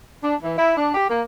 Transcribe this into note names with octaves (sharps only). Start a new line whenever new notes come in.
D4
E3
E4
D4
G4
A#3